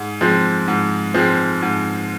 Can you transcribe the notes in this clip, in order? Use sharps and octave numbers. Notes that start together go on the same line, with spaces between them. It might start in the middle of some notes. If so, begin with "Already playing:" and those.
Already playing: G#2
F3 G#3 C4
G#2
F3 G#3 C4
G#2